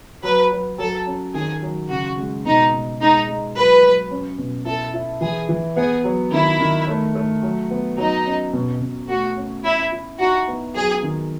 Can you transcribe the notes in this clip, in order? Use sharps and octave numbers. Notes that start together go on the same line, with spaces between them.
F#3 B4
F#3
F#3 A4
C#4
D#3 G#4
F#3
C#3 F#4
G#3
B2 D#4
B2
G#3 D#4
G#3
F#3 B4
F#3
C#4
B2
E4 A4
E4
E3 G#4
E3
B3 G#4
F#3
D#3 E4
D#3
A3
A3
F#3
B3
F#3 D#4
C#4
B2
B2
A3 F#4
C#4
C#4 E4
E4
D#4 F#4
B3
F#3 G#4
D#3